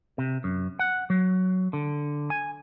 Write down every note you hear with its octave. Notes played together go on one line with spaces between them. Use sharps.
C3
F#2
F#5
F#3
D3
G#5